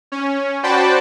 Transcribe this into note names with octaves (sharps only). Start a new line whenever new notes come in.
C#4
F#4 C5 D5 G5 A5 B5